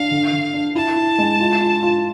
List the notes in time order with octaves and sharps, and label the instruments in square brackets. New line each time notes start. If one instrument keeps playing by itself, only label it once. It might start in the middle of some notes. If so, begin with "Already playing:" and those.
Already playing: [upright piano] D4 [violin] F5
[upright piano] D3
D3
D4
[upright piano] E4 [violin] A5
[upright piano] E4
G#3
F4
F4
F4